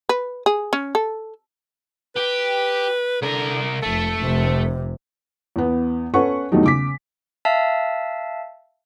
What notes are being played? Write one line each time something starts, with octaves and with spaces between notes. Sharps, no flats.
B4
G#4
C#4
A4
G4 B4
C2 D3 A#4
F1 A3 A4
F1 C3
E2 B3
C#4 A4 B4 F#5 C#6
E2 D#3 F#3 G3 A3 D#4
C#3 D6 B6
E5 F5 A5